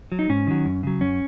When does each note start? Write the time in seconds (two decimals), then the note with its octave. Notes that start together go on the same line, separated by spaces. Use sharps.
0.12 F#3
0.19 D#4
0.29 G#2 C#4
0.47 D#3 F#3
0.65 F#2
0.83 C#3 F#3
1.01 F#2 C#4